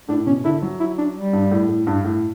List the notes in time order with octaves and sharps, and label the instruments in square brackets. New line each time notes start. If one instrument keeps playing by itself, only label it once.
[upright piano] A2 [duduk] D4
[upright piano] B2 [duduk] C#4
[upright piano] D3 [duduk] E4
[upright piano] F#3
[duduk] E4
D4
G3
[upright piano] G2
A2
A2
G2
A2